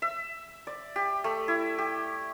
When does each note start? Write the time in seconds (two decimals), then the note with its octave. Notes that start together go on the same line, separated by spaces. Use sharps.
0.02 E5
0.67 D5
0.96 G4
1.24 A3
1.48 E4
1.78 G4